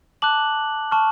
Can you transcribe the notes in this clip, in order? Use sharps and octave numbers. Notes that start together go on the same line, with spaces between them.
A5 D6 F#6 F#7
A5 C#6 F6